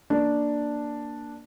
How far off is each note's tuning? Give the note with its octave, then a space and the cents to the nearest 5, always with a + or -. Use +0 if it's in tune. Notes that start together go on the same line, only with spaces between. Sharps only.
A#3 +0 D4 +0